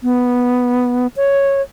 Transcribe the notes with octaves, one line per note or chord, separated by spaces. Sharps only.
B3
C#5